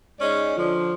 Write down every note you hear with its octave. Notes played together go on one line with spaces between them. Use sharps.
G#2 G#3 C#4 D5
D3 F3